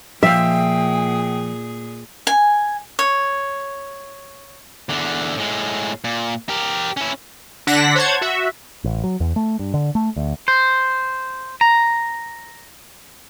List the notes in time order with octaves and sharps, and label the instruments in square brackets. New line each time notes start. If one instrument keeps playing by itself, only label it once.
[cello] A#2 G#4 [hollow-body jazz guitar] F3 F5 [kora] E5 [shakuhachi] G5
[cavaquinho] G#5
C#5
[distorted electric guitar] E2 D3
A2 G#3
A#2
G4 A#4
C#4 E4
[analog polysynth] D3 D4 F#5 A#6 B6
C5 C#5 F#5 A5 G#6
F#4 E5
[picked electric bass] A1
F#3
E2
A3
G2
D3
A3
D2
[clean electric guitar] C5
A#5